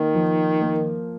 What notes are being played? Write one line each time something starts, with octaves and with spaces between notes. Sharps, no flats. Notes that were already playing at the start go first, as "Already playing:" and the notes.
Already playing: D#3 A#3
F3
A#3